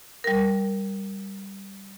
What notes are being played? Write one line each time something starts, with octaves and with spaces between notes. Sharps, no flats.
G3 A#4